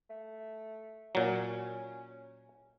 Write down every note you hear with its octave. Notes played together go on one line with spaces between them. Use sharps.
A3
A#2 F#3 C#4